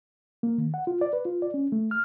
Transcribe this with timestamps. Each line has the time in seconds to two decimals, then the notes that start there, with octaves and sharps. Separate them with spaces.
0.43 A#3
0.58 D#3
0.74 F#5
0.87 F4
1.01 D5
1.13 B4
1.25 F4
1.42 D5
1.54 C#4
1.72 A3
1.91 F6